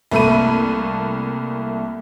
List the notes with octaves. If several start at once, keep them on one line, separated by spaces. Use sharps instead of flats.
C2 A3 A#3 A4 B5 D#7